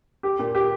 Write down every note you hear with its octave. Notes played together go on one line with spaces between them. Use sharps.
G4
A#2
G4